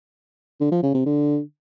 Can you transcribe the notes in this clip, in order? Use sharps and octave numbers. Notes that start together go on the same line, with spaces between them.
D3
F3
C#3
C3
D3